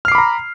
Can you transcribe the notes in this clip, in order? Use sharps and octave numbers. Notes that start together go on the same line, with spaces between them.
A#5 B5 D6 F6 C7